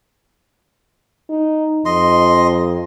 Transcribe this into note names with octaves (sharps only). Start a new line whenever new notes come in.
D#4
F2 D#5 C6